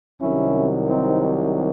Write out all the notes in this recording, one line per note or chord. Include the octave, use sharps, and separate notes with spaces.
C2 C3 D#3 F#3 C#4 E4
C4 D#4